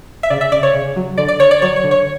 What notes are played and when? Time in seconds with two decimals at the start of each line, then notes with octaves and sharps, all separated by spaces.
0.23 E5
0.30 C#3 D5
0.41 E5
0.52 C#3 D5
0.63 C#5
0.74 C#3
0.96 F#3
1.18 D3 D5
1.28 D5
1.40 D3 C#5
1.51 D5
1.62 F#3 C#5
1.76 C#5
1.84 D3
1.91 C#5